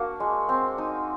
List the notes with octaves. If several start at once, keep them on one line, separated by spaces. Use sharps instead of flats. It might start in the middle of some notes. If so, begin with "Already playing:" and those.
Already playing: A#3 D4 F#4
G#3
C4
D#4